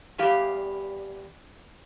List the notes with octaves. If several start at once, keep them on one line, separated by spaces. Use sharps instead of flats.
E2 G3 G4 F5